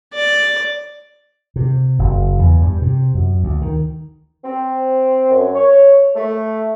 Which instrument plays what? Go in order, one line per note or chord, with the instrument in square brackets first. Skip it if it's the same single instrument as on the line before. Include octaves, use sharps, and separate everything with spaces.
[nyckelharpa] D5
[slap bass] C3
F#1
E2
G2
C3
F#2
D2
D#3
[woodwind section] C4
F#2
C#5
A3